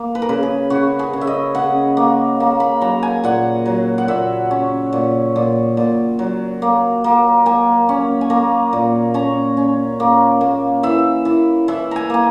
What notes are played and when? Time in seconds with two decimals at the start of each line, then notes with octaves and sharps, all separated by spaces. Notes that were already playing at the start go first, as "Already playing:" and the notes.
Already playing: A#3
0.15 B4
0.22 A#4
0.29 C#3 B4
0.43 G#4
0.70 C#3 F#4
0.99 G#4
1.13 C#3
1.21 E5
1.27 D#5
1.55 C#3 F#5
1.97 A#3
2.40 A#3
2.60 B5
2.81 F#3 A#5
3.03 G#5
3.24 A#2 F#5
3.66 F#3
3.98 F#5
4.08 A#2 E5
4.51 C#4
4.93 A#2
5.36 A#2
5.77 A#2
6.19 F#3
6.62 A#3
7.04 A#3
7.46 A#3 G#5
7.89 C#4
8.21 G#5
8.30 A#3 A#5
8.73 A#2
9.14 C#4 A#5
9.57 C#4
10.00 A#3
10.41 A#3
10.83 E3 E5
11.25 E3
11.68 E3 E5
11.91 G#5 A#5
12.10 A#3 G#5